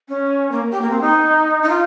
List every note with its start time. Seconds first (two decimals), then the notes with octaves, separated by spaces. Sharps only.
0.09 C#4
0.51 A#3
0.71 G4
0.81 A#3
0.90 C4
1.01 D#4
1.63 D#4
1.69 F4